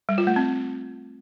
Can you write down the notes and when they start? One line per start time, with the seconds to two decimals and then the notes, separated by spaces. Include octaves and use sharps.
0.09 G3
0.18 F4
0.27 A3
0.36 C4